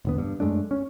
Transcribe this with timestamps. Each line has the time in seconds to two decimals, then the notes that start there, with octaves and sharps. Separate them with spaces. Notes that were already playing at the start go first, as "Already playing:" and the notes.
0.05 E1 D3 B3
0.18 G2
0.40 F#2 G#3 A3 D4
0.71 C#4